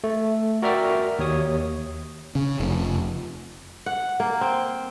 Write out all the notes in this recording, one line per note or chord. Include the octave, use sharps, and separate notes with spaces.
A3
F#4 A#4 D5 E5 G5 F6
D#2 C#5 D#6
C#3
F1
F#5
A#3
C4